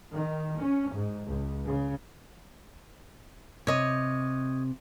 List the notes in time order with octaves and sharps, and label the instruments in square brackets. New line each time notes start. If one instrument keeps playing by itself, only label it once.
[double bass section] D#3
C#4
G#2
C#2
C#3
[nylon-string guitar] C3 [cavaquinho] C#5 D#5